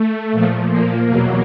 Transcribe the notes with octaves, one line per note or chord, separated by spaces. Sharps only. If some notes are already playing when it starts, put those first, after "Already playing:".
Already playing: A3
A#2 F3
A#3
E2 B2 F#3